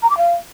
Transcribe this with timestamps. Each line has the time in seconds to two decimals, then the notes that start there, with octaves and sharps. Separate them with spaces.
0.02 A#5
0.10 D6
0.17 F5